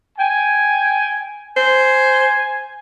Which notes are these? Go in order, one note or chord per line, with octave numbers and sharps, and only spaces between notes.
G5 G#5
C5 G#5